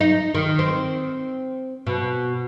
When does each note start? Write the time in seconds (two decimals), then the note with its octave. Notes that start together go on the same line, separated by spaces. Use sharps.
0.01 D#4
0.35 D#3
0.59 C4
1.87 B2